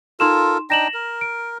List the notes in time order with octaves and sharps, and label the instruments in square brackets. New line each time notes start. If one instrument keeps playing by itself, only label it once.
[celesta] D#4 C6 E7 [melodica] F4 A4 A#4
[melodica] D4 D#4 G5 [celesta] A#6 E7 F#7
[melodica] A#4
[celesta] D7